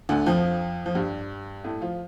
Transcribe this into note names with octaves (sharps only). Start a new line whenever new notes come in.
D2 D3
F2 F3
F3
G2 G3
A2 A3
F3 F4